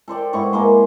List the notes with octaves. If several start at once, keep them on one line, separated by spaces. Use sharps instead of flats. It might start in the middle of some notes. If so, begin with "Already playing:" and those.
A4 C5 D5 G5
G#2 B3 E4 C#6
G#3 A#3 C6